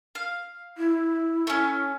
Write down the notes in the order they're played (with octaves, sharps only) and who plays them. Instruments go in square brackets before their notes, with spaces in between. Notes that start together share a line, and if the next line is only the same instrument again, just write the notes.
[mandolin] F5
[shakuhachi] E4
[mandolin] A3 C#4